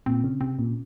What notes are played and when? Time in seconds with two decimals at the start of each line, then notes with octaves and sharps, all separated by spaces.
0.06 A#2 C4
0.24 C#3
0.41 C3 C4
0.58 A#2 C#4